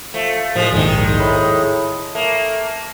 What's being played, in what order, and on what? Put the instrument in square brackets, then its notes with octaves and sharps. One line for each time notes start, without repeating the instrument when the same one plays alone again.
[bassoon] F3 [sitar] A3
[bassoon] C2 [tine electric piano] A2 [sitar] F3 G#3
[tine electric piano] A#1 D#2 G#2 [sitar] D#3 G#3
[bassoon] A2 [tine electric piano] B5
[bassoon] A3 [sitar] A#3